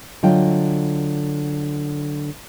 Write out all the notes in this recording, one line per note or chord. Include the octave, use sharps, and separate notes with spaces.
D3 F#3 F4 D#5 G5